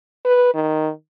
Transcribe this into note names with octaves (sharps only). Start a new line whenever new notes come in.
B4
D#3